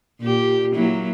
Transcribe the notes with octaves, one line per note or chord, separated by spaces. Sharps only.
A#2 G4
F#3 A#3 E4